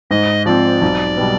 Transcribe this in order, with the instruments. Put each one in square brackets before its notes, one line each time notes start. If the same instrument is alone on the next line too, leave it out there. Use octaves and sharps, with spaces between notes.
[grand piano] G#2 [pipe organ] D#5
[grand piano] F3 C4 [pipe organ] D5
[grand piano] B1
B2 G3 B3